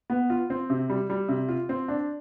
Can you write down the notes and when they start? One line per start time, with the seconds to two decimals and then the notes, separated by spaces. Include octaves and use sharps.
0.10 B3
0.30 F4
0.50 C4
0.70 C3
0.90 G3
1.10 G3
1.29 C3
1.49 F4
1.69 C4
1.88 D4